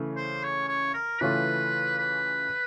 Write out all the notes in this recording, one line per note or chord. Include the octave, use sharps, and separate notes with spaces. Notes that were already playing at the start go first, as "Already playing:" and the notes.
Already playing: C#3 E3 A3
C5
C#5
C#5
A#4
C#3 E3 A3 C#4 F4 B4
B4